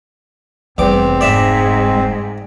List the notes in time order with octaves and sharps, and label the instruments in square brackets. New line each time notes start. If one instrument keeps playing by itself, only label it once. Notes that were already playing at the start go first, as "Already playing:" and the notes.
[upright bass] F1 G3 [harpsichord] E2 D6 [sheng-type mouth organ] C4
[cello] G#2 G#3 [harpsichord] D5 E5